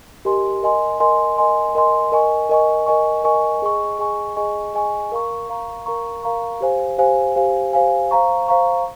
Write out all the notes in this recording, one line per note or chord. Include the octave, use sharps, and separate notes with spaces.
G4 A#4 D#5 G#5 C6
A#4 D#5 G#5 C6
A#4 D#5 G#5 C6
A#4 D#5 G#5 C6
A#4 D#5 G#5 C6
A#4 D#5 G#5 C#6
A#4 D#5 G#5 C#6
A#4 D#5 G#5 C#6
A#4 D#5 G#5 C#6
G#4 D#5 G#5 C#6
G#4 D#5 G#5 C#6
G#4 D#5 G#5 C#6
G#4 D#5 G#5 C#6
A#4 F5 A#5 C#6
A#4 F5 A#5 C#6
A#4 F5 A#5 C#6
A#4 F5 A#5 C#6
G4 C5 F5 G#5
G4 C5 F5 G#5
G4 C5 F5 G#5
G4 C5 F5 G#5
C5 F5 A#5 C#6
C5 F5 A#5 C#6